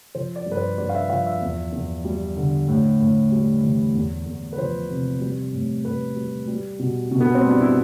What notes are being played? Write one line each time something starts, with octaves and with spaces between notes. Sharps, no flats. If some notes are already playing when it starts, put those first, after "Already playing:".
F3 C5
D5
G2
B4
C5
G2 D5
F5
E5
F3 F5
E5
E2
E2
G3
D3
A2
A2
G3
E3
E2
E2
B4
F3 C5
C3
G3
A2
A2 B4
G3
G3
B2
B2
B3
C4
G3
D4
E4